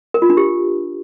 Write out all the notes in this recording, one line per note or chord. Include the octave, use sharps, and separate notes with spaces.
A#4
F4
D4
G4